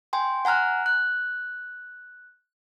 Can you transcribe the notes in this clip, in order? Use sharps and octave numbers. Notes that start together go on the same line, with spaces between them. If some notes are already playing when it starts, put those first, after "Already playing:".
G5 G#5 C6
F#5 G#5 A#5 F6 F#6
F#6